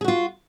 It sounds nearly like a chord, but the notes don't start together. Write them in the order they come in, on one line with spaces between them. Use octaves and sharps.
G#4 F#4 F4